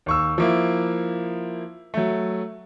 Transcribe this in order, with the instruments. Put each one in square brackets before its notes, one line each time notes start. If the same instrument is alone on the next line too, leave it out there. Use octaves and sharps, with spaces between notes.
[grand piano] D#2 C#6 E6
F3 A#3 E4
F#3 A3